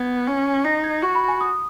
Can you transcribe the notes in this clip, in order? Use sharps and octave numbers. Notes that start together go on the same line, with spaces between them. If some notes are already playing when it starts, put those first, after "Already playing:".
Already playing: B3 G#6
C#4
D#4 A#6
G#6
F#4 C#6
B5
G#5
D#6